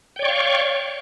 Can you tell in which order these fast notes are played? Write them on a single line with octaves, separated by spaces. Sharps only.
G5 C#5 D5 C#6 F5